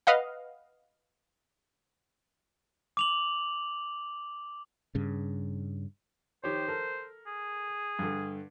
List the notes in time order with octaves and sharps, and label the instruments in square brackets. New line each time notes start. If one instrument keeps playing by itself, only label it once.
[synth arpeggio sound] B4 D#5 F5 F#5
[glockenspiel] D6 F7 F#7
[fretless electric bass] G2 C#3
[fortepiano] D#3 G4 C#5 [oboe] C5
[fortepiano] A4 A#4
[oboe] G#4
[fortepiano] G2 D3